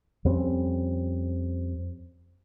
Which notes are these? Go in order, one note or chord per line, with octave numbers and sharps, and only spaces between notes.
F2 G3 C4 C#4